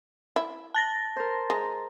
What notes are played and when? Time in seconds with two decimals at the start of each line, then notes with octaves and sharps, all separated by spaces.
0.36 E4
0.74 A5 A6 A#6
1.16 A#4 C5
1.50 G#3 A#5